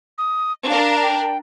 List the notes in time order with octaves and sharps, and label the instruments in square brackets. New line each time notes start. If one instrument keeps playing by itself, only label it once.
[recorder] D#6
[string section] D4 A#4 [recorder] F5
[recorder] G5